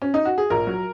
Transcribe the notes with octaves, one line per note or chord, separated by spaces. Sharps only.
C#4
D#4
F#4
G#4
A#1 A#4
F#3